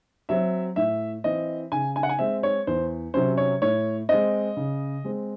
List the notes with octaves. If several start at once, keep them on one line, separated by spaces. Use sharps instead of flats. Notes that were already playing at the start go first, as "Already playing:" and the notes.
F#3 C4 E5
A2 E5
E3 C4 D#5
C#3 G#5
G#5
F#5
G#5
G#3 C4 E5
C#5
E2 C5
C3 F#3 C#4 C5
C#5
A2 C#5
G#3 C4 D#5
C#3
G#3 C4